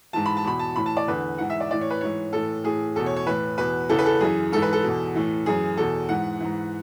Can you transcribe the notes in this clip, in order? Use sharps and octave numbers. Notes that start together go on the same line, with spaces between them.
G#2 E3 A5
B5
A5
E2 B2 B5
A5
A2 E3 B5
A5
D5
E2 D3 B4
G#2 E3 F#5
E5
D5
A2 E3 D5
C#5
B4
G#2 E3 C#5
A2 E3 A4
A2 E3 G#4
E2 B2 A4
C#5
C#5
A2 E3 B4
E2 B2 B4
E2 C#3 E3 A4
B4
A4
F#2 E3 G#4
G#2 E3 A4
B4
A4
E2 B2
A2 E3
F#2 E3 G#4
E2 B2 A4
G#2 E3 F#5
G#2 E3